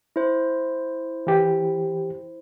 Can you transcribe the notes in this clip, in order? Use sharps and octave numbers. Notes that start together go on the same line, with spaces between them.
E4 C5
E3 G4